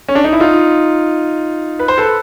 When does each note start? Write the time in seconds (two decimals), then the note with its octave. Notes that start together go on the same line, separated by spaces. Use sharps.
0.08 C#4
0.15 D4
0.24 D#4
0.33 E4
0.40 D#4 F4
1.79 B4
1.88 C5
1.98 A4 B4